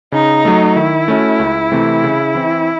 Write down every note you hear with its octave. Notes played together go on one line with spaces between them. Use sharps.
C#3 D#4
F#3 A3
D#3 E4
A3 C#4 F#4
C#2
C3 E3 A3 C4
C#3
E3 C4